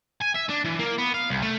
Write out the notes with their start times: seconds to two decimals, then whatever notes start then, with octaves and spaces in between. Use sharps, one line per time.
0.21 G#5
0.34 E5
0.49 D4
0.64 E3
0.79 A#3
0.98 B3
1.14 F5
1.30 C2
1.42 A3